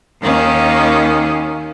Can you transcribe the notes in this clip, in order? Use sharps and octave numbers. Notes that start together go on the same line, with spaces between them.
D#2 D#3 A#3 C#4